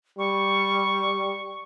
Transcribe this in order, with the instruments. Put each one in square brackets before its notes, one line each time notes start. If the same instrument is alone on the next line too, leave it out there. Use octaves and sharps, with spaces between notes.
[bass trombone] G3 [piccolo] C#6